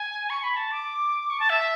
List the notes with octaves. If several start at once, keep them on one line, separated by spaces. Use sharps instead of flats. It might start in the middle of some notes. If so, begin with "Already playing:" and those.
Already playing: G#5
C#6
B5
A5
D6
C#6
A5
E5